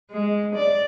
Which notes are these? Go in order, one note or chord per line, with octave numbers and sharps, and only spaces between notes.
G#3
D5